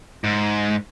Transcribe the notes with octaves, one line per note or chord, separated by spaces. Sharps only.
G#2